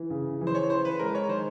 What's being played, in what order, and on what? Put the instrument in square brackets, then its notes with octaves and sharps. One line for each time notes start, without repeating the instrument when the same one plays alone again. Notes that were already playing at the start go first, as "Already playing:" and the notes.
Already playing: [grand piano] E3
C#3
E3
[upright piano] C5
C#5
[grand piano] E3 [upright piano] C5
[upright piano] B4
[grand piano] G#3 [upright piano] A#4
[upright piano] C#5
[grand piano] D#3 [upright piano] C5